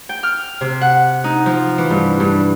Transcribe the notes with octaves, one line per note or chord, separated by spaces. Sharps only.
G5
F6
C3
F#5
D#4
F3
E3
G2
G2